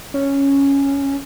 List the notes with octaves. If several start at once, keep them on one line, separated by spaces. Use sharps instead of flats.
C#4